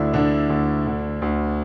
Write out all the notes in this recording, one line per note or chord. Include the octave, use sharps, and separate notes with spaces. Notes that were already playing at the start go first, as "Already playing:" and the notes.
Already playing: D2 D3 D4 E4 A4
D3 D4
D2
D3
D2